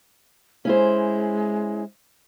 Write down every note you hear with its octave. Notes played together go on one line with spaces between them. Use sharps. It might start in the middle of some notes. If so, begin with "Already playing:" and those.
G#3 C#4 E4 C5